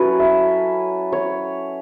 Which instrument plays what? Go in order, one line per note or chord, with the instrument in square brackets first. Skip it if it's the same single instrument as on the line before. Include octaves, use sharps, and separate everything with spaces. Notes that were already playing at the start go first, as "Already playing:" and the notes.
Already playing: [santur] F#3 C#4 E4 A4 B4 C#5
E5
C#5